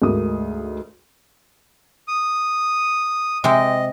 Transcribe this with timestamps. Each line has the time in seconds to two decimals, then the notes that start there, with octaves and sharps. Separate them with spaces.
0.02 D2 G#2 A#4 D#6
2.08 D#6
3.44 C3 G#3 D#5 G5